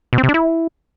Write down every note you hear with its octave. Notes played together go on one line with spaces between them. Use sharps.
B2
C4
C3
D4
E4